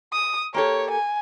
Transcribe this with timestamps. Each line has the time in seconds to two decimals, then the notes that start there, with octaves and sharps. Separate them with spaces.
0.13 D#6
0.54 A#3 G4 A4 C#5
0.91 G#5